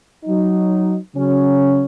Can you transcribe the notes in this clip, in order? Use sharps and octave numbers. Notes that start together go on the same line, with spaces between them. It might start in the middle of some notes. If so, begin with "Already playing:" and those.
F#3 D#4
C#3 F#3 C#4